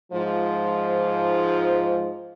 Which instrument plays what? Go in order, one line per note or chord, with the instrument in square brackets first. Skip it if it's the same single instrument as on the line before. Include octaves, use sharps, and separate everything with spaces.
[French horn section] G#2 F3